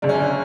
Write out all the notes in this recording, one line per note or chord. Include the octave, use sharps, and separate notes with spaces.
G1 F#2 C#3 D4
C#4
D4